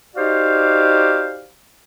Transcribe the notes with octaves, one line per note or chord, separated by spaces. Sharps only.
D#4 F#4 G4 C5 D5 F5